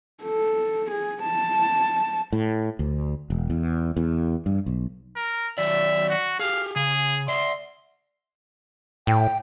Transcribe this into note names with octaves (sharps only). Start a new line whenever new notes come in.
A4
G#4
A5
A2
D2
E1
E2
E2
G2
B1
A#4
D#3 F#3 D5 E5
F#4
G4 G#4 F5
C#3 G#4
D5 E5 C6
A2 G5